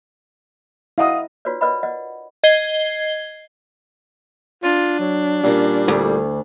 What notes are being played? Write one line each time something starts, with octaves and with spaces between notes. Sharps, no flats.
E4 D#5 F5 F#5 D#6
D#4 F4 F#4 B4 C#5 D5
A#4 B4 D5 D#5 F#5 B5
D5 D#5 F#5
D#5 G#6 C7 G7
D4 F4
F#3
A#2 G3 C#4 A#4
D2